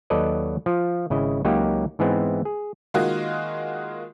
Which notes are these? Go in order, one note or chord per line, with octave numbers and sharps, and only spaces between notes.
D#2 F#3 A4 B4 D5 D#5
F3
G#1 C#3 E4 D#5
C#2 F#3 A#3 D#4 G4 A#5
G#2 E3 G#3 B3 C4
G#4
D#3 G#3 A#3 F4 F#4 D#5